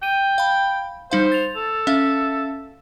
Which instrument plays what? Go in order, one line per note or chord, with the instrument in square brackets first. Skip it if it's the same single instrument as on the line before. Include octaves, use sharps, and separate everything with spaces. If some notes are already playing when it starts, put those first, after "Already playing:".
[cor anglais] G5 [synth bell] D#7
[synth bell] F5 B5
[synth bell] G3 D#4 F5 [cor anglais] C5
[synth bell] A6 F7
[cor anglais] A4
[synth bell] C#4 E5 F5